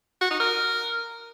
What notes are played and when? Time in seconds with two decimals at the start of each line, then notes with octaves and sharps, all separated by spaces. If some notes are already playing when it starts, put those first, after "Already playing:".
0.21 F#4
0.31 D#4
0.40 A#4